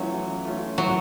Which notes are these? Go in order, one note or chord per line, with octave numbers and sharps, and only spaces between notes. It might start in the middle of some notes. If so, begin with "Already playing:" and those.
Already playing: E3 F#3 A3 C#4 F4
E3
A3 C#4 F4
E3 F#3